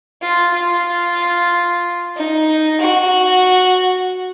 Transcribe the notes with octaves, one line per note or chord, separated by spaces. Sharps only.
F4
F4
D#4
F#4